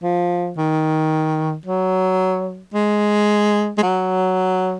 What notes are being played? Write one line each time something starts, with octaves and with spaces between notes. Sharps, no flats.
F3
D#3
F#3
G#3
G#3
F#3